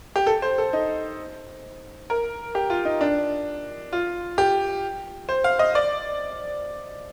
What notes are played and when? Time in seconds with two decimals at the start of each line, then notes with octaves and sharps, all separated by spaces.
0.16 G4
0.27 A4
0.42 C5
0.58 A4
0.73 D#4
2.10 A#4
2.55 G4
2.70 F4
2.85 D#4
3.01 D4
3.93 F4
4.38 G4
5.29 C5
5.44 F5
5.59 D#5
5.75 D5